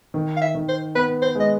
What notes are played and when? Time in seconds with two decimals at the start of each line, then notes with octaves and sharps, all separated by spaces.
0.14 D#3
0.36 F5
0.41 E5
0.55 D#3
0.68 C5
0.95 B3 B4
1.22 C5
1.35 G#3 D#5